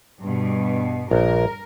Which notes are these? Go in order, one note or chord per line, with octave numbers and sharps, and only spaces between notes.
G2 B2
A#1 A#4